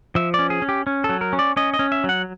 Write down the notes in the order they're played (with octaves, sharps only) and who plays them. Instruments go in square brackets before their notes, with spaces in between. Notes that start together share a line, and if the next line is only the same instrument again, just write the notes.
[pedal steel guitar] F3 E5
C#4 D5
G#4
C#4
G4
C#4
A4
F#3
A#4
C#4
D5
C#4 D#5
D#5
C#4
E5
F#3
F#5